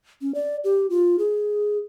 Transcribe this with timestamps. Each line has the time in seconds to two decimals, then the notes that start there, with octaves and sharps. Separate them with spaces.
0.22 C#4
0.35 D5
0.64 G4
0.90 F4
1.19 G#4